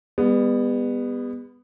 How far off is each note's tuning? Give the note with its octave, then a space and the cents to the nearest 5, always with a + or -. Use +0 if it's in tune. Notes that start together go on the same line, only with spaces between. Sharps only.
G3 +45 B3 +0